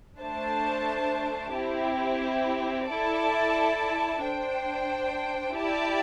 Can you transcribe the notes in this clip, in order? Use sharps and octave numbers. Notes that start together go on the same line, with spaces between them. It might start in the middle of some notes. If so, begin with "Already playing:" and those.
A3 D4 C5 A5
C4 E4 G4
E4 A4 D5 A5
D4 C5 G5
E4 G4 D5 A5